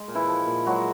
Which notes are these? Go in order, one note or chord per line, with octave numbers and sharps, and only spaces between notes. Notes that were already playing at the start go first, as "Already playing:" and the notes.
Already playing: G#3
A#2
E3 E4
F3
A#2
F#3 G#3 F#4